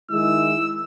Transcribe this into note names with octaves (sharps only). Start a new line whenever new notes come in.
D#3 G#3 E4 E6